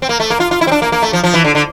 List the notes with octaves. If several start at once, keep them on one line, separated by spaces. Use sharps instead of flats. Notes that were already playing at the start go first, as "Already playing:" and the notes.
C4
A#3
A3
A#3
F4
F4
E4
C4
D4
A#3
A#3
A3
F3
F3
E3
D3
D3